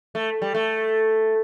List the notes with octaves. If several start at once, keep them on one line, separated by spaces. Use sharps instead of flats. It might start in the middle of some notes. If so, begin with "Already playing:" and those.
A3
G3
A3